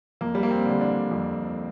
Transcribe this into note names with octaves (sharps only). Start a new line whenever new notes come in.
F2 A#3
G3
A#3
C4
D3 G3
D4
F2